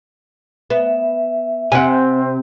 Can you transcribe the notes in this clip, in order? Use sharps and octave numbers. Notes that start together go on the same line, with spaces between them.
B3 E5
C3 C4 F#5 G#5